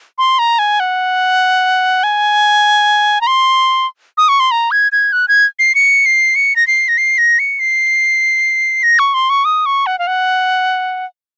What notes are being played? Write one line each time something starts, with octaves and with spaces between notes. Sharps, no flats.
C6
A#5
G#5
F#5
G#5
A#5
C6
D#6
C#6
C6
A#5
G#6
G#6
F#6
G#6
C7
C#7
C7
C#7
A#6
C7
A#6
C7
A#6
C#7
C7
A#6
C#6
C6
C#6
D#6
C#6
F#5
F5
F#5